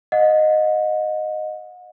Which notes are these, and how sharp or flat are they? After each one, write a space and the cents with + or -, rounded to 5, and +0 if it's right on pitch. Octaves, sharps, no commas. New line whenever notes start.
D#5 -5 F#5 -35